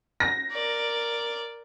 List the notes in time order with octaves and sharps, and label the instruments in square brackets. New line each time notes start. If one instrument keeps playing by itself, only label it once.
[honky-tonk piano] A#6
[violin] A#4 D5